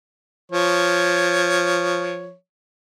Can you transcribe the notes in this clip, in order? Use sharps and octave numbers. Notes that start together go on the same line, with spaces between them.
F3 C#5